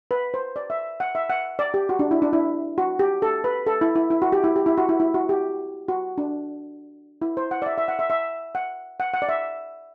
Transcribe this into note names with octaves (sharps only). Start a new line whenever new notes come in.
B4
C5
D5
E5
F#5
E5
F#5
D5
G4
F#4
D4
E4
D4
E4
F#4
G4
A4
B4
A4
E4
E4
E4
F#4
G4
E4
G4
E4
F#4
E4
E4
F#4
G4
F#4
D4
E4
C5
F#5
D5
E5
E5
F#5
E5
E5
F#5
F#5
F#5
D5
E5